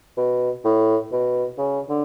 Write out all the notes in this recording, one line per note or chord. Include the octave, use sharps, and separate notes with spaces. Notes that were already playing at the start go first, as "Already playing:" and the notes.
B2
A2
B2
C#3
D3